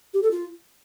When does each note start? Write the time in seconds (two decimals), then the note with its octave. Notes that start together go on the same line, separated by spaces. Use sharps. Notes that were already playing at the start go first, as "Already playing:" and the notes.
0.14 G4
0.22 A4
0.31 F4